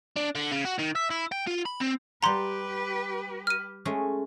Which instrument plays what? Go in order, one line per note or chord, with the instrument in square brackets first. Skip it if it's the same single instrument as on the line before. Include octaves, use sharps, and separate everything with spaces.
[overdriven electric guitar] D4
D3
C#3
F#4
D#3
E5
E4
G5
F4
B5
C4
[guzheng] G3 F#5 [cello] G4 B4 [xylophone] A#5 C6
[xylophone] F6 D#7
[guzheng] G#3 A3 C#4